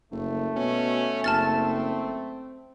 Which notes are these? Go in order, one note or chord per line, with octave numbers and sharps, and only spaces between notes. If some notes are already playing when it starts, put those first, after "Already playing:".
F#1 A3
B2 C#4
F#1 C4 A5 F6 A6